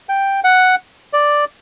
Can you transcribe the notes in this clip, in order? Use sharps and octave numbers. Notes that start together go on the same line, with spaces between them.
G5
F#5
D5